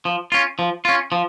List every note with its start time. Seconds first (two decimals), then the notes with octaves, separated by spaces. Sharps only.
0.05 F3
0.32 C#4 F4
0.59 F3
0.85 C#4 F4
1.12 F3